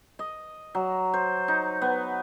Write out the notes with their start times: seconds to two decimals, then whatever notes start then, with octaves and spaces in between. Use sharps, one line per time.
0.19 D#5
0.75 F#3
1.14 C5
1.48 D#4
1.82 B3